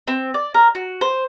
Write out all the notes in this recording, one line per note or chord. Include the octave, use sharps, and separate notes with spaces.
C4
D5
A#4
F#4
C5